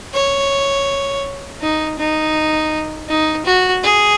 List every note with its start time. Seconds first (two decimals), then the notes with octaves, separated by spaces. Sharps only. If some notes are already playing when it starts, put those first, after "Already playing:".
0.14 C#5
1.61 D#4
1.99 D#4
3.09 D#4
3.46 F#4
3.83 G#4